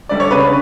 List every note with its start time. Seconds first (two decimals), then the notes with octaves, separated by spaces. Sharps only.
0.09 D3 G3 D5
0.20 C#5
0.31 C#3 B4